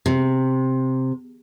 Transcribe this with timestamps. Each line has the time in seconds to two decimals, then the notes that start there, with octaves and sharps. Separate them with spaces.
0.06 C3